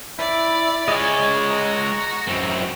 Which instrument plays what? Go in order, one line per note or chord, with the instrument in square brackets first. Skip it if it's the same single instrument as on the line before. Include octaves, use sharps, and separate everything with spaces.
[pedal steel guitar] E4 [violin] D5 B5
[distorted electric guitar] G#3 C#5 [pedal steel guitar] D#5 G#5
[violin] F#4 A#5
[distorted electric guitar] F#2 C4